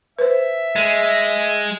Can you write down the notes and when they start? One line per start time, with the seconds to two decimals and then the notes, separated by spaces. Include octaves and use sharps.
0.19 B4 C5 E5
0.76 G#3